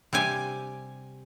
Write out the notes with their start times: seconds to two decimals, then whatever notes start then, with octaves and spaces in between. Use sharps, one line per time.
0.13 C3 G3 G4 G#5